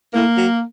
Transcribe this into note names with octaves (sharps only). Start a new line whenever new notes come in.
A2 A#3
F#3